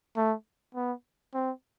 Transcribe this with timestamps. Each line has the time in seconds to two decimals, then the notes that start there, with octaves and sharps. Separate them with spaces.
0.16 A3
0.75 B3
1.34 C4